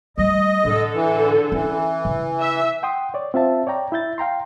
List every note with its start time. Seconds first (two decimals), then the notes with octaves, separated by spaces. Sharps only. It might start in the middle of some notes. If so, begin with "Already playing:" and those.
0.18 G3 A3 D#5
0.65 A2 D3 A4
0.94 E3
1.52 E3 C#4
2.05 C#3
2.41 E5
2.83 F#5 G5 C6 D#6
3.14 C#5 D5
3.34 C4 F4 E5 A5
3.67 C#5 D5 G5 A#5
3.92 E4 E5 G6 A6
4.18 F5 G5 A#5 C6